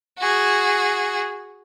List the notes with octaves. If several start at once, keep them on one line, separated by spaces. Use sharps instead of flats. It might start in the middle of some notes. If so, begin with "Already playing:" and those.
F#4 G#4